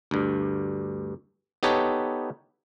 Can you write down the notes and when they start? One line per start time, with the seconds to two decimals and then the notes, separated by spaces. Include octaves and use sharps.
0.11 D2 G2
1.63 B3 D#4 G4 A4 B4 C#5